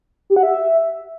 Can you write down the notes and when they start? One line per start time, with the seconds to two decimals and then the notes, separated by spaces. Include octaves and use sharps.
0.30 G4
0.36 F#5
0.43 E5